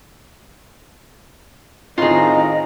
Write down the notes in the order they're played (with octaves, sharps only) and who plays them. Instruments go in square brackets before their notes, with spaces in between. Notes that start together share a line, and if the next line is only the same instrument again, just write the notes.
[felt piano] A2 D#3 [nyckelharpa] C4 A#5 [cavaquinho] F4 G#4 [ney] D#5